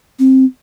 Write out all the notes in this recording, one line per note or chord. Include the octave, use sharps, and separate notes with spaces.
C4